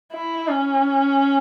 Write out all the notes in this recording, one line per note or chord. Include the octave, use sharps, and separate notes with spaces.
E4
C#4